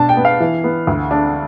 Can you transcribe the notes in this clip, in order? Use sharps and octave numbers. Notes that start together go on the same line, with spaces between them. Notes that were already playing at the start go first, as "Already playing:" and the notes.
Already playing: B2 D4 A5
G5
B3
F5
E3
B3
D2
D4